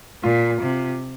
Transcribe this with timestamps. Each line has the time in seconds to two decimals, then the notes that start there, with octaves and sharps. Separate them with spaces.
0.23 A#2 F4
0.61 C3